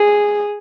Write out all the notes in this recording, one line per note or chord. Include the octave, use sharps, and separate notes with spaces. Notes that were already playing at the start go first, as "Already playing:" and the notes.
Already playing: G#4